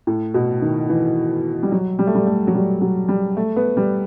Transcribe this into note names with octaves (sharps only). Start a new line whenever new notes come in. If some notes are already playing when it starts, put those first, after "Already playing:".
A2
B2
D#3
E3
G3
F#3
G3
A3
G3
A3
F#3
G3
F#3
G3
A3
B3
G3